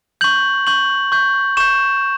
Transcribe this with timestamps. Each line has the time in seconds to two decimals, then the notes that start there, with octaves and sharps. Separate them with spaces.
0.21 C#6 G6 F#7
0.67 C#6 G6 F#7
1.12 C#6 G6
1.57 C#6 G6 E7